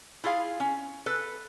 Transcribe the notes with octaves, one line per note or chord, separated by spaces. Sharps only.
E4 F4 G#4 F5
C#4
A4 B4